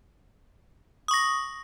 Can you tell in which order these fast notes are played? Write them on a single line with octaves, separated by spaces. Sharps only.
D#6 C#6 A#6